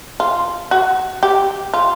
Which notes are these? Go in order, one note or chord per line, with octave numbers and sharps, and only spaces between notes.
F4
F#4
G4
F4